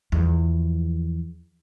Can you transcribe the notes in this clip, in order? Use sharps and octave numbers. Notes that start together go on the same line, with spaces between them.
E2 F3